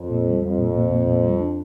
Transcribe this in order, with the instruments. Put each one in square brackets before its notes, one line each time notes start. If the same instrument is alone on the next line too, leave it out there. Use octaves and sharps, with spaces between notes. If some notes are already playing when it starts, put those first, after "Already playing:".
Already playing: [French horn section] F2
[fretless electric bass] A#2
G3
[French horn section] F2 [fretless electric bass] G3
[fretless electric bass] A#2
A#2
A#2
A#2
G3
D4